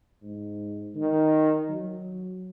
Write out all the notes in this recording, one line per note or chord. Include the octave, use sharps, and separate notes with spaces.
G#2
D#3
F#3